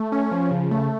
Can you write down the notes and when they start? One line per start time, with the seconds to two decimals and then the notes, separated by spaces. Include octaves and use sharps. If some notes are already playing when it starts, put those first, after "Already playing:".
Already playing: A3
0.12 C#4
0.31 F3
0.51 C#3
0.71 A3